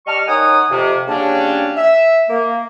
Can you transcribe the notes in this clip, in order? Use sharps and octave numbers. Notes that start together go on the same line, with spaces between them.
G3 D#5 A5 C#6 F6
D#4 A#4 C#5 F#5 G#5 D#6
F2 C3
C#3 F#3 G3 A#3 C#4 D4
E5
A#3